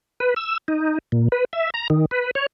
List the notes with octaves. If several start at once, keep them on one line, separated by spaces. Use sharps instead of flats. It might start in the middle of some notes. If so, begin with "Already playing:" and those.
B4
E6
D#4
A#2
B4
E5
A#5
D#3
B4
C#5